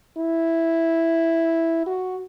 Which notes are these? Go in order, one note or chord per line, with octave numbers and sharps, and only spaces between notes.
E4
F#4